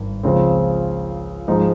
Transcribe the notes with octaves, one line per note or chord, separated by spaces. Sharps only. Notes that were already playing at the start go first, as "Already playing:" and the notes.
Already playing: G#1 G2
C#2 C#3 F3 G#3 C4
G#2 F3 G#3 D#4